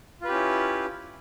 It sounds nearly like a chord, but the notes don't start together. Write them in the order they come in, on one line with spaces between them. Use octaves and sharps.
F4 B4 G4 C#4 E4